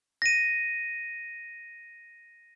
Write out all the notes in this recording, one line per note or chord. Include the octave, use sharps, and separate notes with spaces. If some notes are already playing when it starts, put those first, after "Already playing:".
A#6 D#7